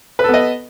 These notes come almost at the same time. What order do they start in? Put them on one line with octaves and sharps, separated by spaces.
B4 A4 B3 D#5